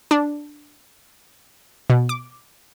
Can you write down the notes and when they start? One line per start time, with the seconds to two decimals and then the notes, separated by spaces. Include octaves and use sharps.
0.11 D4
1.90 B2
2.09 D6